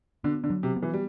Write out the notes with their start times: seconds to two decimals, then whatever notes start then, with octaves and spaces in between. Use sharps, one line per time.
0.24 D3 B3
0.44 D3
0.50 F#3
0.63 C3
0.76 B3
0.83 E3
0.93 G3